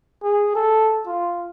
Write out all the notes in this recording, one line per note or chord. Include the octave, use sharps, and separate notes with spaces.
G#4
A4
F4